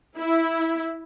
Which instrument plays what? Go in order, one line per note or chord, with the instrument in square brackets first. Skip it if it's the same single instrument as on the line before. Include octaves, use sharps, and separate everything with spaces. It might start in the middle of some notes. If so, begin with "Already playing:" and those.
[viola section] E4